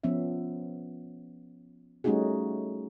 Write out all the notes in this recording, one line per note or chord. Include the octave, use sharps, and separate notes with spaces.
F3 B3 C#4 E5
G3 A3 C#4 D#4 F#4 G#4